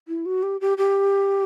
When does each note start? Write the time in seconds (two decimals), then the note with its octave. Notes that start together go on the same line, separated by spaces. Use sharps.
0.08 E4
0.26 F#4
0.43 G4
0.61 G4
0.78 G4